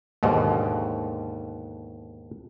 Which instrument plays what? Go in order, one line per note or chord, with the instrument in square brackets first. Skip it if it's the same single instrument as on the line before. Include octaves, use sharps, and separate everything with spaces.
[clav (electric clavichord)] D#2 G#2 B2 D3